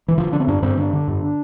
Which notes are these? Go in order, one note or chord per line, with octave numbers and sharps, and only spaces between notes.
E3
D3 F3
D3 D4
C4
G2 D4
G2 C4
D3 D4
D3
G2